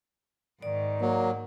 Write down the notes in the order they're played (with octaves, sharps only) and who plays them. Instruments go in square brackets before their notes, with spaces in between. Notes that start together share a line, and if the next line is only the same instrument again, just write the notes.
[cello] G#2 D#3 [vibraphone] D5
[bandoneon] F#3 [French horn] A#3